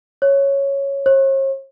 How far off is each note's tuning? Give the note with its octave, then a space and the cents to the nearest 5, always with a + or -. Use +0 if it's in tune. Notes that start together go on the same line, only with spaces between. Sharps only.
C#5 -5
C#5 -45